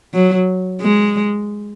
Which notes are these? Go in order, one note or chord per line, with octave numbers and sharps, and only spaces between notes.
F#3
G#3